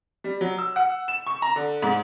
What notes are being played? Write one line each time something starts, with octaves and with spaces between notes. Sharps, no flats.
G3
F#3
E6
F#5
E7
C#6
A#5
D3
G#2